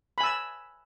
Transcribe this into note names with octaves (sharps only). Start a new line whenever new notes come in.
G#5 B5 E6